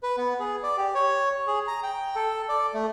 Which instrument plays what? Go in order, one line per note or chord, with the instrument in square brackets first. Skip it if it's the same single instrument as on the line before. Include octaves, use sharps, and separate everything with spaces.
[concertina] B4
B3
G#4
D5
G4
C#5
G#4
A#5
G5
A4
D5
A3